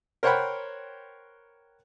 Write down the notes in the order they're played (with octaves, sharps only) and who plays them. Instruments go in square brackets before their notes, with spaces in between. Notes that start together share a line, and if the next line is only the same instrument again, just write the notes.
[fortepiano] A#4 C5 C#5 F#5 G5 B5